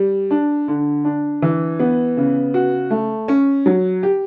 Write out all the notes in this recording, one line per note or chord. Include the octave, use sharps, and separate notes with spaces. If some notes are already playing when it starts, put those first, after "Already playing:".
Already playing: G3
D4
D3
D4
E3
B3
C#3
F#4
A3
C#4
F#3
G4